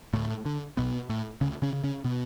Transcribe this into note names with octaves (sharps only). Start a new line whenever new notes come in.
D2 A2 A3
D3
B1 B2 B3
A2
D2 C#3 C#4
C#3 C#4
C#3
C#3 C#4
B2 B3